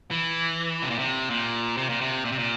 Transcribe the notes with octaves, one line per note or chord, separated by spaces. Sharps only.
E3
C3
A#2
C3
A#2
C3
A#2
C3
A#2
C3
A#2